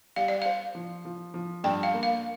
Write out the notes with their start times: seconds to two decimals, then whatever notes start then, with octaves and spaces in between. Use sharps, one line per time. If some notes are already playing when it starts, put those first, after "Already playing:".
0.16 G3 F5
0.28 D5
0.42 C5 F5
0.75 F3
1.05 F3
1.34 F3
1.64 G2 G5
1.83 F5
1.93 A#3
2.03 F5